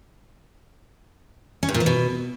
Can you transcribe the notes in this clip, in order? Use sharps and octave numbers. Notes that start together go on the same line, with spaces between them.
C#4
G2
A#2
E3
B2